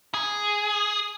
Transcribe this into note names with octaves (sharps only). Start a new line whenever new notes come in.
G#4